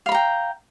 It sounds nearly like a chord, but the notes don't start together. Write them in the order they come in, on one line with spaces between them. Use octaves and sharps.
F5 B5 A#5 G5